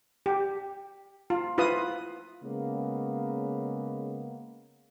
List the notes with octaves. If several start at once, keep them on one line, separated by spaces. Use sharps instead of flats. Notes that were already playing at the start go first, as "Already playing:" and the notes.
G4
F4
E4 F4 B4 D#6
C#3 G#3 A#3 B3